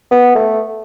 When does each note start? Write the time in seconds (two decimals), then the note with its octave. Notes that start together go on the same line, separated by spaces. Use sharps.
0.11 B3
0.35 A3